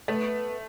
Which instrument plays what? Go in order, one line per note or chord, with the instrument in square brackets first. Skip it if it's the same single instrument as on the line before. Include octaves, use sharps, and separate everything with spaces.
[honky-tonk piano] A3 [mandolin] B3 B4